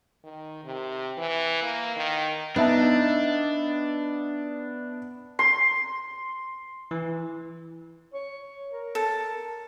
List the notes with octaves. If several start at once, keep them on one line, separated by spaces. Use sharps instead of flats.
D#3
C3
E3
A#3
D#3
B3 D4 D#4 E5 A5
C6
E3
C#5
A#4
A4